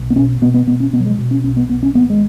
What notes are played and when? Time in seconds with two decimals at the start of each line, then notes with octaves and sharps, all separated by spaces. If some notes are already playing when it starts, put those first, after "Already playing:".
Already playing: B1
0.10 B3
0.16 B2 C#4
0.41 B2 B3
0.54 B3
0.67 B2 B3
0.80 C#4
0.93 B2 B3
1.00 F#3
1.06 G#3
1.19 B2
1.31 C#4
1.44 B1 C#4
1.57 B3
1.69 B1 B3
1.83 C#4
1.95 G#1 B3
2.10 G#3